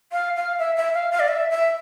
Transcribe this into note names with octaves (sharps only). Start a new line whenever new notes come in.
F5
F5
E5
E5
F5
F5
D5
E5
E5